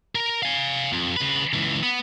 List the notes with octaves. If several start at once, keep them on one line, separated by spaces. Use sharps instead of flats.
A#4
F5 G#5
F2
C#3 B4
C#2 E3
B3